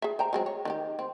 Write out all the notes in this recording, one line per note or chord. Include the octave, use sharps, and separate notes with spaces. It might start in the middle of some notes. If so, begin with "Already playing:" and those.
G#4 E5
C5 G5 A#5
F#3 G#3 C4
C#5
D#3 D4 G4
C4